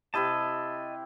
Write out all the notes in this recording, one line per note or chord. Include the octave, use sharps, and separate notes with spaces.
C3 E4 G4 D#5 A5